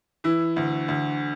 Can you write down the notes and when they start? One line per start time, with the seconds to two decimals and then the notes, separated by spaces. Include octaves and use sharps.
0.24 E3 E4
0.56 D2
0.88 D2